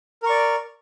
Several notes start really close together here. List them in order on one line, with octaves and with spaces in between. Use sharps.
A#4 C#6 D5